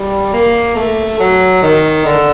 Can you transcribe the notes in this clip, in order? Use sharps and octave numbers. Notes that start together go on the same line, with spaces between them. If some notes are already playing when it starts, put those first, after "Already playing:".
Already playing: G3
A#3
A3
F#3
D#3
D3